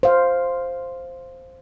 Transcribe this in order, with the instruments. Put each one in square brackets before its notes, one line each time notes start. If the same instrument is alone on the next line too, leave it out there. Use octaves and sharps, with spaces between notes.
[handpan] C5 F5